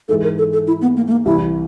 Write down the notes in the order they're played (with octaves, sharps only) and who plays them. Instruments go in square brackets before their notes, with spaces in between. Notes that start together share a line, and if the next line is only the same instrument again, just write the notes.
[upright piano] G#2 E3 G#3 [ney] A4
[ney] A#4
A4
A4
E4
B3
A#3
A3
A#3
[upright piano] C2 C3 E3 G3 [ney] E4